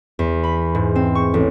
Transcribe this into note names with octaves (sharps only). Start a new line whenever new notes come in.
E2
B5
G#2
C4
C#6
A1